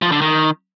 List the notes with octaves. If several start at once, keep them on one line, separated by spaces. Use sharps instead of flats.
F3
D3
D#3